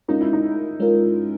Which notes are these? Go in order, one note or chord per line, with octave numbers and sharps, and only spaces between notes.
G#3 C#4 D#4 F4 A#4
E4
D#4
G#3 C#4 F4 A#4